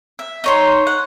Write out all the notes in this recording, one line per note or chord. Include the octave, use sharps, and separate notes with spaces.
E5
D#4 C#5 C6
F#5